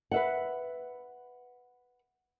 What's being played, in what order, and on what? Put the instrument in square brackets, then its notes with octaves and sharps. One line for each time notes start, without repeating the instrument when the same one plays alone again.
[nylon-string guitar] B4 E5 F#5